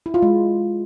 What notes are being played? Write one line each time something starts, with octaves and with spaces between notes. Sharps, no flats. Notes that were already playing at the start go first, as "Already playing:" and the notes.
E4
F4
G#3